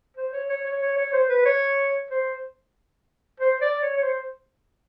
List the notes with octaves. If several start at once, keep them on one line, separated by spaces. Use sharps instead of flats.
C5
C#5
C#5
C#5
C#5
C#5
C5
B4
C#5
C5
C5
D5
C#5
C#5
C5